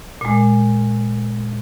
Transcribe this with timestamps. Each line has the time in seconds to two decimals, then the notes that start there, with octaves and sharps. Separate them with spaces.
0.21 A#2 G#3